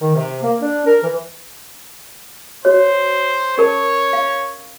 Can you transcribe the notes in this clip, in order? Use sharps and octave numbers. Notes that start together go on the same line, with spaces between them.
D#3
C3
A#3
D4
A#4
E3
F#4 C5 C#5
C#4 A#4 C#5 A5
F5